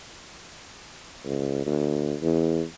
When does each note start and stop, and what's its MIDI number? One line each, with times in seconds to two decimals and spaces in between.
1.25 1.63 37
1.66 2.16 38
2.22 2.62 40